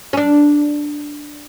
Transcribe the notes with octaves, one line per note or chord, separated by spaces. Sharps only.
C#4
D4